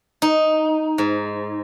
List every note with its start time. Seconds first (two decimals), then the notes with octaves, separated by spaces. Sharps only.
0.22 D#4
0.98 G#2